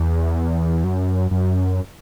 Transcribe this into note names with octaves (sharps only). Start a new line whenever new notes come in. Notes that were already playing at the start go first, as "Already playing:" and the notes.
Already playing: E2
F#2
F#2